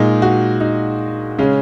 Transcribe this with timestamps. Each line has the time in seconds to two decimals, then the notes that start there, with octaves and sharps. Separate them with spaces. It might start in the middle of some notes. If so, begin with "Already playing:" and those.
Already playing: A#2 G#3 D#4
0.22 F#4
0.61 D#4
1.38 C#3 G#3 C#4